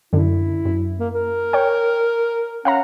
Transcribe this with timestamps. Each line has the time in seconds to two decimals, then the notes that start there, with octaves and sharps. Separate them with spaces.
0.13 F#2 D3 E4
0.65 F#2
0.99 A#3
1.15 A#4
1.53 C#5 G5
2.65 C#4 F5 F#5 A#5